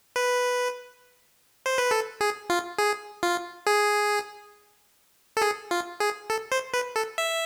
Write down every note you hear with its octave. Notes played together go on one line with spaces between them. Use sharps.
B4
C5
B4
A4
G#4
F4
G#4
F4
G#4
A4
G#4
F4
G#4
A4
C5
B4
A4
E5